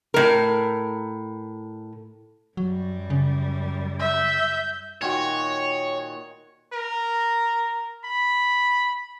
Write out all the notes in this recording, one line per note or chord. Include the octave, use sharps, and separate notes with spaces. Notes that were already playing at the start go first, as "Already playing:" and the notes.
A2 A#4
F#2 F#3 G3
C#3
E5 G6
A#2 D#3 F#4 C#5
A#4
B5